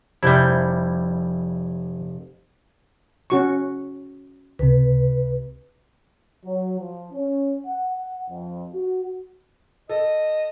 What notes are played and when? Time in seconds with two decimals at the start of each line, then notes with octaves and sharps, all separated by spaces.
0.23 F1 G3 E4 G6 G#6
3.30 C#4 F#4 C#6
4.59 C#2 C3 B4
6.45 F#3
6.80 F3
7.12 C#4
7.67 F#5
8.30 F2
8.74 F#4
9.89 A4 D#5